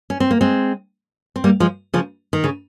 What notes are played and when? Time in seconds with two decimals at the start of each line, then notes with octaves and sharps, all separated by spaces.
0.10 C#4
0.20 C4
0.31 A#3
0.41 G#3 C4
1.36 C4
1.44 G3 A#3
1.60 F3 G#3
1.94 C#3 F3
2.33 D#3
2.44 C#3